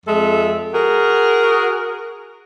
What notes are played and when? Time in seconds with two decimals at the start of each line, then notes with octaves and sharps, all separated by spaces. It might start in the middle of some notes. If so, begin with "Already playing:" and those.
0.06 F2 G#3 A4 E5
0.72 F#4 G#4 A#4